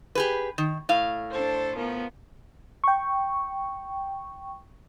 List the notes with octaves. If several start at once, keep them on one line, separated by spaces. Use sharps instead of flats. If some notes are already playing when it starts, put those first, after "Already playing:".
G4 G#4 B4
D#3
A2 F5
D4 A4 C5
D#3 F3 B3
G5 C#6